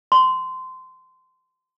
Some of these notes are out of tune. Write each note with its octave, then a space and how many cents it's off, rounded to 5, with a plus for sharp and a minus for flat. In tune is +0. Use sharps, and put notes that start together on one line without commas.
C6 -20